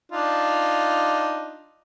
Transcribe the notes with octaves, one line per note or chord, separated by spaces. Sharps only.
D4 D#4 F4